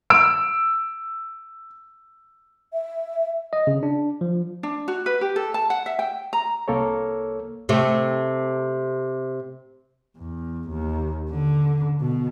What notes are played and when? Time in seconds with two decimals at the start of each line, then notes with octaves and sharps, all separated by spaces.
0.10 E6 D7
2.73 E5
3.53 D#5
3.67 C#3
3.83 D4
4.21 F3
4.63 D4
4.88 F#4
5.06 B4
5.21 G4
5.36 A4
5.54 A5
5.70 F#5
5.86 E5
5.99 G5
6.33 A#5
6.68 C2 A#3 A4 A#4 C#5
7.69 C3 A3
10.18 E2
10.70 D#2
11.30 D3
12.01 B2